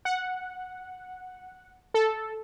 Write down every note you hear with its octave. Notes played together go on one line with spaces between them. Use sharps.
F#5
A4